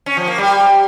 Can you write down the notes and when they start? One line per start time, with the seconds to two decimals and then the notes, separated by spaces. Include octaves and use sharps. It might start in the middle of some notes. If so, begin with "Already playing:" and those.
0.06 C#4
0.17 F3
0.28 A#3
0.38 G3